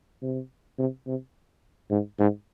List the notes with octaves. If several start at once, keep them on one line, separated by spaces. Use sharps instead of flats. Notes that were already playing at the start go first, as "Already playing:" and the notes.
C3
C3
C3
G#2
G#2